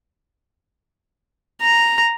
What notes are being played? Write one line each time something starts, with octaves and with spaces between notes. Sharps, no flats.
A#5